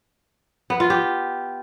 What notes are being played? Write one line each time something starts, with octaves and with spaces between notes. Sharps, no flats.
B3
F4
G4